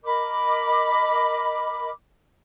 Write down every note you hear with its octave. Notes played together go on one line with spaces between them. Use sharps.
A#4 D#5 B5 D6